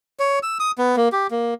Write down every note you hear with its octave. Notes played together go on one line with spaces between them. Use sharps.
C#5
E6
D#6
B3
A#3
G4
A#3